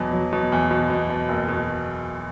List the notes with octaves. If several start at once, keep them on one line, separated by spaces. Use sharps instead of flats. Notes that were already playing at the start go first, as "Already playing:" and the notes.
Already playing: E2 B2 F#3
F#3
B2
E2
B2
B2
B2
F#1
B2